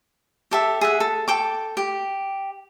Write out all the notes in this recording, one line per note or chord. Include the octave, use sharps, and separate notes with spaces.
G4 A4 E5
G#4 E5 F#5
A4
A4 G5 D6
G4